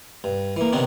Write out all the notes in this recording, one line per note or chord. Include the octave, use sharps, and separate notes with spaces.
G2
E3 A#3
C3 D#3 B3 C#4 D4